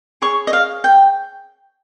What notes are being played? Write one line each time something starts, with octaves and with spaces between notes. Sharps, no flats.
G#4 C#5 C#6
D#5
F5
G5